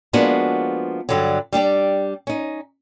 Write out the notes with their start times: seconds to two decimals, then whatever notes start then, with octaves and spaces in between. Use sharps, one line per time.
0.13 F3 G#3 A#3 B3 D4 F#4
1.09 G2 D3 F#3
1.53 G3 D4 G4 D5
2.27 C#4 D#4